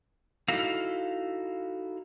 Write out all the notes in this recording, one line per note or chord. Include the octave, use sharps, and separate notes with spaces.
D#4 E4 F#4 A4 F5